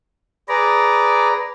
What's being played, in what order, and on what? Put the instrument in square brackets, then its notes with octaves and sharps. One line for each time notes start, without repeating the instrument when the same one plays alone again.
[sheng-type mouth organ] G#4 D5 [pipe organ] B4 A#5